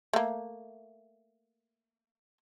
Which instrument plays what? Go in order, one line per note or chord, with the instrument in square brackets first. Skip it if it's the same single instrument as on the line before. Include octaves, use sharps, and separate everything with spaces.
[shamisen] A3 A#3